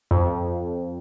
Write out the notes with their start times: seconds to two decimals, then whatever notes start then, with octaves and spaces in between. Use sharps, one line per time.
0.11 F2